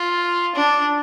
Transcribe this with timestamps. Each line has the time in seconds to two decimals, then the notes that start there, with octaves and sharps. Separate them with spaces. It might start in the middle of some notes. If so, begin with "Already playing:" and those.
Already playing: F4
0.55 D4